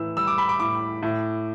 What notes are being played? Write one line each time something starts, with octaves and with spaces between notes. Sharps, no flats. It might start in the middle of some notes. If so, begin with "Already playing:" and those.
Already playing: A2 E3 E6
G3 E6
D6
B5
D6
A2 D6
A2